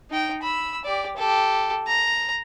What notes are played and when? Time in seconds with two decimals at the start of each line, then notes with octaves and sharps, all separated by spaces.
0.10 D#4 G5
0.42 B5 E6
0.85 G4 D5
1.17 G4 A4
1.87 A#5